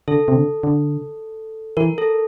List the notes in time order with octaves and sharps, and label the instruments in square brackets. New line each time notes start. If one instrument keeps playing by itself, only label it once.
[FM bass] D3 [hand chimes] A4
[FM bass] C3
D3
D3
[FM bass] E3 [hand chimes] A#4
[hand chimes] A4